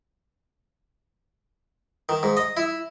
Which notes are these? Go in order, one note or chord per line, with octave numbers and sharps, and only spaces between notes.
D#3
G#2
D#5
E4